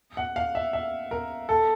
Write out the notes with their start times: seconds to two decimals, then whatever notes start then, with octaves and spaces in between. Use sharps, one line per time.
0.17 F#5
0.36 F5
0.55 E5
0.73 E5
1.11 A#4
1.49 A4